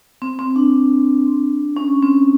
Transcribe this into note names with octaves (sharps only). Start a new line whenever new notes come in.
C4
C4
D4
C#4
C4